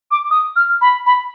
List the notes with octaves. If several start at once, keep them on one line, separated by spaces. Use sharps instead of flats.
D6
D#6
F6
B5
B5